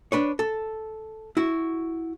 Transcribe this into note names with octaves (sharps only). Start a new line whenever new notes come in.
D4 B4 C#5
A4
E4 F#4